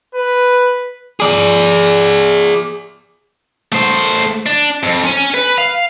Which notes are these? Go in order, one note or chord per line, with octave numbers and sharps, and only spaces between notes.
B4
G#4 D5
A3 C5
D4
F2
C#4 G#5
B4
F5